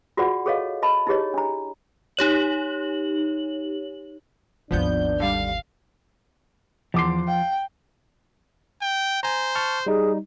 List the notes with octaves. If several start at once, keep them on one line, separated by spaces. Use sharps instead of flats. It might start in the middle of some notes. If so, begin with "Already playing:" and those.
F4 F#4 G#4 D5 F#5
G#4 A4 C#5 D#5 F5
D#5 A5 B5
D#4 E4 G4 G#4 C#5 D#5
D4 A#5
D#4 G4 C#5 F#7
G#1 D#2 F3 B3 D4 G6
D3 G3 F5
E2 F3 C6 D6 C7
F5 G5
G5
C5 G#5 A#5
A5 C#6 F6
G3 D#4 G#4